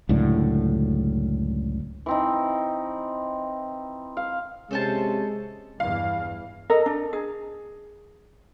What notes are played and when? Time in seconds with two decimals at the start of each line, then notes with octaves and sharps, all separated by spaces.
0.09 C#2 F#2 A2 D3
2.06 E3 C4 D#4
4.17 F5
4.71 C3 G#3 C#4 A4 C5 A5
5.80 E2 G2 E3 F5
6.70 A4 A#4 D#5
6.86 D4
7.13 G#4